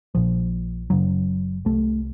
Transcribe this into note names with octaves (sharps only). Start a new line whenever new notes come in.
A#1 A#2 F3
F#1 F#2 C#3 F#3
C2 C3 A3